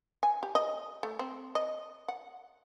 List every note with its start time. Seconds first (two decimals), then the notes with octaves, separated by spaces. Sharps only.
0.23 G#5
0.43 G4
0.55 D#5
1.03 A3
1.19 C4
1.55 D#5
2.08 F#5